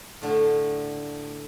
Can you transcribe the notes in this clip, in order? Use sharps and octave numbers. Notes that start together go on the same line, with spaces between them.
A2 D3 A3